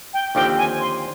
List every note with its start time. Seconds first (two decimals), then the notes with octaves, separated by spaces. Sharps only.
0.14 G5
0.35 D#2 D3 F3 C4 G4 G5
0.58 G#5
0.80 C6